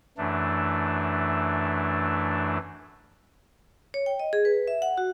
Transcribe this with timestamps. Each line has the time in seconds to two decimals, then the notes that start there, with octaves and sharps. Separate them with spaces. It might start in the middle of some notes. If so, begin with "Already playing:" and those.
0.18 F#2 E3 A3 D4
3.94 C#5
4.06 G5
4.20 D#5
4.33 G#4
4.45 B4
4.68 E5
4.82 F#5
4.98 F#4